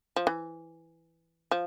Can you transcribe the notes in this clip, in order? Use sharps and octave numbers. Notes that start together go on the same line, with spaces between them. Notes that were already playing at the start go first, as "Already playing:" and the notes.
F3
E3
F3